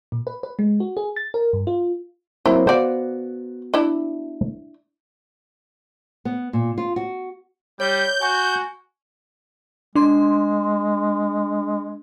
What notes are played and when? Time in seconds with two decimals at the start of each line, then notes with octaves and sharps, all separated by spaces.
0.12 A#2
0.27 B4
0.43 B4
0.59 G#3
0.80 F#4
0.97 G#4
1.16 A6
1.34 A#4
1.53 G2
1.67 F4
2.46 F#3 A#3 C4 E4
2.67 B3 F#4 C5 D5 F5
3.74 D4 E4
6.25 B3
6.53 A#2
6.78 F4
6.96 F#4
7.80 G3 C#5 G6
8.21 F#4 G#5 C#6
9.96 G#3 D4 C6